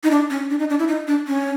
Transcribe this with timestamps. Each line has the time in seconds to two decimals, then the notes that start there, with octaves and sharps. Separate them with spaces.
0.04 D#4
0.11 D4
0.30 C#4
0.50 D4
0.59 D#4
0.70 D4
0.79 E4
0.88 D#4
1.07 D4
1.27 C#4